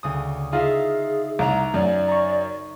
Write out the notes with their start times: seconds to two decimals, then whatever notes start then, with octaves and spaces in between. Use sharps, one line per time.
0.03 D2 C#3 D#6
0.53 D#4 F4 G#4 E5 F5
1.39 C2 A#5
1.74 F#2 D5
2.08 A#5 C#6